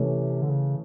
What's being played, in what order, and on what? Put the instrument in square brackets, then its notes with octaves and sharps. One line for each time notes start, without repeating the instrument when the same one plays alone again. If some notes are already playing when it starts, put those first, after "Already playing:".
Already playing: [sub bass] C3 [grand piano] E3 A3 C#4
[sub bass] D3
C#3